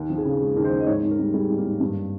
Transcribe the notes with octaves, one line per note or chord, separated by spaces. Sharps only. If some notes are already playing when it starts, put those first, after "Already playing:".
Already playing: D#2
F3
G#4
C#3
G#3
D#2 A#4
C5
F3
D#5
G#2 C#5
G#2
A#4
G3
G3 G#4
G#2
A#3
G#2
G2